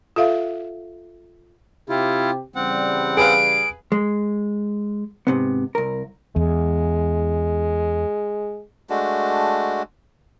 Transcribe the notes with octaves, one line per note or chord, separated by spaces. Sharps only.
F4 A4 E5 F5
C3 E4 F4 G4
C#3 E3 G3 C4 F#5
G#4 B4 F5 D7
G#3
G#2 C3 B3
C2 A#4
E2 G#3
G#3 A3 D4 F#4